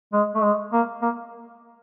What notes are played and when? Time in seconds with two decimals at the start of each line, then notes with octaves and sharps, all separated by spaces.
0.13 G#3
0.35 A3
0.43 G#3
0.73 A#3
1.02 A#3